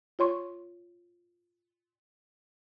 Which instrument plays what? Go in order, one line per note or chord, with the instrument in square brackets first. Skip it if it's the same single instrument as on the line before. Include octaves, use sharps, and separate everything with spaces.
[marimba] F4 C#5 C6 C#6